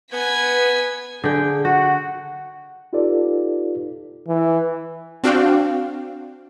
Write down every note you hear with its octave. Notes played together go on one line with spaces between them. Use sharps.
B3 B4 G#5 G#6 B6
D3 G#4 G5
F#4 F#5
D#4 F4 G4 A4 B4 D5
E3
C4 D4 F#4 F5 G5